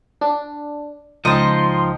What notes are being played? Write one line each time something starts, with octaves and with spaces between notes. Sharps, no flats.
D4
C#2 F3 D#4 D#5 G5 A5 C6